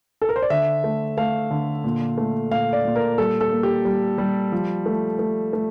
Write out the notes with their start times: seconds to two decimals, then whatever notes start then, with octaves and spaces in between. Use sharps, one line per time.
0.22 A4
0.29 A#4
0.36 C5
0.42 D5
0.50 D3 E5
0.84 A3
1.18 A3 F5
1.51 D3
1.84 A#2
2.18 A3
2.51 A#2 F5
2.73 D5
2.85 A#2
2.96 A#4
3.18 G3 A4
3.41 A4
3.52 A#3
3.63 G4
3.85 G3
4.18 G3
4.52 F3
4.86 A3
5.19 A3
5.53 A3